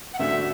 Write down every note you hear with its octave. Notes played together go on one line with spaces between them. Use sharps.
F#5
D2 D3 A3 D4 F#4 E5